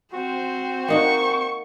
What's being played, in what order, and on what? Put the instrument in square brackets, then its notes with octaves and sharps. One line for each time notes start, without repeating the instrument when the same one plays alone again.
[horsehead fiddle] C4 C5 [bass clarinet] F#4
[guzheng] A#3 D#4 F#5 [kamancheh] C#6